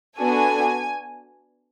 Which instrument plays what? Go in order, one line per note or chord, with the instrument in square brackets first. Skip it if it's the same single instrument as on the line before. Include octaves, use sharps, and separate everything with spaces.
[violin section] B3 D4 F#4 A4 G#5